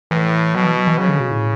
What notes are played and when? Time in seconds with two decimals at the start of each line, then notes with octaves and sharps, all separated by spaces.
0.11 A2 E3
0.54 B2 F#3
0.65 E3
0.77 F#3
0.87 E3
0.98 C#3 F#3
1.09 D3
1.20 B2
1.31 A2